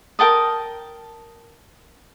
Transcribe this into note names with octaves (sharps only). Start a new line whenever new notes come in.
A#4 G5 A5 D#6